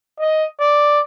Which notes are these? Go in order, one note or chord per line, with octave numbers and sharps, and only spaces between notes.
D#5
D5